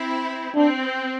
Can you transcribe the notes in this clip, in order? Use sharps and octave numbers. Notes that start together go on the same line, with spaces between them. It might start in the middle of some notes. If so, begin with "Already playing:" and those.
Already playing: C4 E4
C4 D4